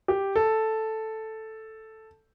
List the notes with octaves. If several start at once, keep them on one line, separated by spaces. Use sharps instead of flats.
G4
A4